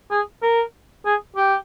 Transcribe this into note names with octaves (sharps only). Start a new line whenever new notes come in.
G#4
A#4
G#4
G4